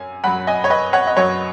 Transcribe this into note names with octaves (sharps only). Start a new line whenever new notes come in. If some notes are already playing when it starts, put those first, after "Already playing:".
Already playing: F#2 G#5
F#2 F#3 F#5 B5
D#5 G#5
C#5
B4 D#5
C#5 F#5
D#5
F#2 F#3 C#5